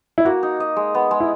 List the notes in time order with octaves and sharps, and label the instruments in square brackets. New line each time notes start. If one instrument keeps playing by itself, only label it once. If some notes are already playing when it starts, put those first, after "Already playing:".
[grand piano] E4
[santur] A#3 [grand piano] F#4
[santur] D#4
D#5
G#3
B3
G#3
[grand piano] E4